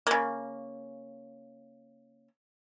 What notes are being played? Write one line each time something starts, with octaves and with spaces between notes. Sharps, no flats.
C#3 A#3